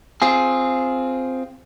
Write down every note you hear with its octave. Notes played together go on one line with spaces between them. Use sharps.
C4 F4 G#4